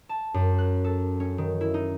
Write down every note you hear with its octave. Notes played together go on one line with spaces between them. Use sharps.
A5
F#2
F#6
A4
C#4
D#3
E4
D#4